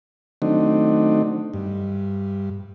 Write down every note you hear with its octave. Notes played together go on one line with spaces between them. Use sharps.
D#3 F#3 A3 C4 D4 D#4
G2